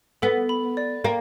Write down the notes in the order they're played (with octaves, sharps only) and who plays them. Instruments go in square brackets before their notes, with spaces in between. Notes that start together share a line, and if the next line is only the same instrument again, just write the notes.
[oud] B3 [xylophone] A4
[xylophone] B5
D5
[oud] A#3 [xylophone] G5